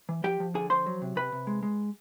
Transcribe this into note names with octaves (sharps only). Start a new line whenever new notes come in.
E3
F3 G4 G5
F3
D3 G#4 G#5
F3 C5 C6
F#3
C3
C3 B4 B5
C3
G#3
G#3